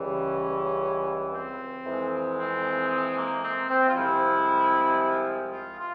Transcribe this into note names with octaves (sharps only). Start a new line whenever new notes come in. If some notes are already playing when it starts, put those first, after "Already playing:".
Already playing: C#2 C#3 E3 G3
C#4
C4
F2 E3 G#3
C4
C4
A#3
C4
C4
F4
C2 C3 F3 G#3 E4
F4
F4